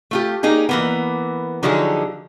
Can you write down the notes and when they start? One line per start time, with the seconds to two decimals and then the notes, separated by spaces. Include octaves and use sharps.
0.11 A3 F4 G4
0.43 A#3 D#4 G4 G#4
0.69 E3 A#3 B3
1.63 D3 F3 F#3 D#4 G4 G#4